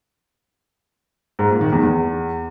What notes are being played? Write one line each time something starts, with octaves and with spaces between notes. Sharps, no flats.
G#2
A#2
D#3
E2
E2